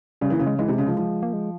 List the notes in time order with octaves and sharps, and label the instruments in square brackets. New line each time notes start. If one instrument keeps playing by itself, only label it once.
[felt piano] C#3 [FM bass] G3
[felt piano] E3
[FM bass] A#3
[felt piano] C#3
[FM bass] G#3
[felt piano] E3 [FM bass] G#3
[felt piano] C3
C#3
F3
F3
[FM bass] A#3
G#3